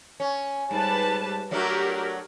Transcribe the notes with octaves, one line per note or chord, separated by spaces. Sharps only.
C#4
G#2 G3 B4 A5
F#3 A3 D4 F#4 G4 A#4